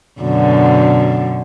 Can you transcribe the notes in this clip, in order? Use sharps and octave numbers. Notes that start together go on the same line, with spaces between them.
F#2 B2 D3